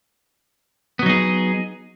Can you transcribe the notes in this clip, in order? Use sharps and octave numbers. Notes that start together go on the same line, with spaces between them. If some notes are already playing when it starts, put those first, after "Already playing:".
F#3 B3 D#4 G#4